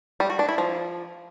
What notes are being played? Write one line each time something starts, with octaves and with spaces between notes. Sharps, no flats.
G3
F#4
D4
E4
F3